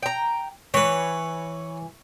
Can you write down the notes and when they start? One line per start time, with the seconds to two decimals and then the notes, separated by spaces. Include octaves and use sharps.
0.03 G5 A#5
0.74 E3 B4 C#5